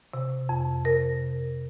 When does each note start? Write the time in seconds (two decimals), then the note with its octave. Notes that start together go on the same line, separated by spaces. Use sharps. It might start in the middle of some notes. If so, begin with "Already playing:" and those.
0.13 C3
0.49 F2
0.85 C3 A#4